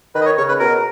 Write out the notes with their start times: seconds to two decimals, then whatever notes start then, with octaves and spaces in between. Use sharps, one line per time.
0.15 D#3 B4
0.21 D#5
0.26 C#5
0.37 C#3 C#5
0.48 B4
0.60 B2 A#4